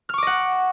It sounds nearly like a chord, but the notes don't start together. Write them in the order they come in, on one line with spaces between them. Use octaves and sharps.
F6 C#6 D6 D#5 F#5